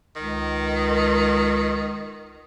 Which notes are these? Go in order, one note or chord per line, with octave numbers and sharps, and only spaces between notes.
C#2 D#3